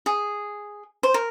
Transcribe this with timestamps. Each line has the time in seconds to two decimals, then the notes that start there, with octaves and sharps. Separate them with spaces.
0.06 G#4
1.03 C5
1.14 A#4